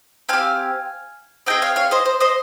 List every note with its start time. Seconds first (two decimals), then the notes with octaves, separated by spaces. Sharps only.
0.29 C4 G4 F5 G#5
1.46 C4 D#4 G#4 D#5 G5
1.62 C#5 F5
1.76 C#5 F5
1.91 C5 D#5
2.06 C5
2.20 C5 D#5